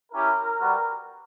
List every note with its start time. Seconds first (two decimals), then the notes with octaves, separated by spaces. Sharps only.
0.12 C#4 E4 G4 A#4
0.58 G3 B3 F#4